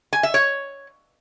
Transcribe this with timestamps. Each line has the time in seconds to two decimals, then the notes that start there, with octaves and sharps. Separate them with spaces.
0.13 G#5
0.23 E5
0.34 C#5